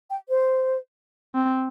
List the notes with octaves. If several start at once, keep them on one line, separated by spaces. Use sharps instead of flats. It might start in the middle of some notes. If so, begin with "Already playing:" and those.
G5
C5
C4